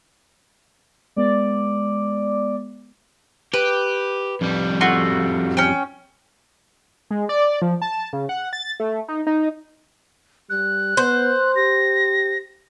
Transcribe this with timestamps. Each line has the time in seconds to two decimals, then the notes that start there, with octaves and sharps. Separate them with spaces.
1.16 G#3 B3 D5
3.54 G4 B4
4.41 F2 G3
4.81 A3 F4 F#4
5.57 C#4 G5
7.11 G#3
7.29 D5
7.62 F3
7.82 A5
8.13 C#3
8.29 F#5
8.53 A6
8.80 A3
9.08 D#4
9.27 D#4
10.50 G3 F#6
10.97 B3 C5
11.56 G4 A#6